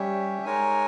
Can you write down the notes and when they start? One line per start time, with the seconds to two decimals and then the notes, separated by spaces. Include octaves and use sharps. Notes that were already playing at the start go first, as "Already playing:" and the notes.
Already playing: G3 C#4 G4 C#5 E5
0.45 G#3 D#4 A#4 C#5 G#5